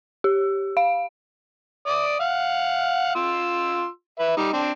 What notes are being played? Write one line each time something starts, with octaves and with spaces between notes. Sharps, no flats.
G4
F5
D5 D6 D#6
F5 F#5
F4 C6 E6
B4 E5
G3 D#4
C4 D4